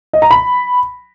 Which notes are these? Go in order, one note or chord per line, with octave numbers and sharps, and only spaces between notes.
D#5
A#5
B5